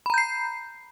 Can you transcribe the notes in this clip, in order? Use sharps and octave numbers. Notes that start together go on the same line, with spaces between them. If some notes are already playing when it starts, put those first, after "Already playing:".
A#5 B5 G6 C7